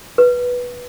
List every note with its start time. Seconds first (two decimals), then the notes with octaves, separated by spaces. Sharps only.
0.18 B4